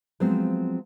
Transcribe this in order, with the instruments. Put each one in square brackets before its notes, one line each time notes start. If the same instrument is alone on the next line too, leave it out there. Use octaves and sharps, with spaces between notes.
[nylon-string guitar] F3 F#3 G#3 B3 C4 F5